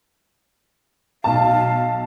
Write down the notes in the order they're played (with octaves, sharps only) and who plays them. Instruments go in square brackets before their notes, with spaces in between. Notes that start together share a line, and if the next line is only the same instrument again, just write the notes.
[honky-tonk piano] B1 A5 [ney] F5